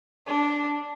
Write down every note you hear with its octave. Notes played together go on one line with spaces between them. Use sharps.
D4